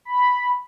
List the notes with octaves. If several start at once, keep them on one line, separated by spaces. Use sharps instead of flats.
B5